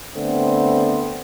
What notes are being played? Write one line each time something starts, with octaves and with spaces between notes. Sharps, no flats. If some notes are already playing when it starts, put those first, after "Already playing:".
D3 A3 B3 C4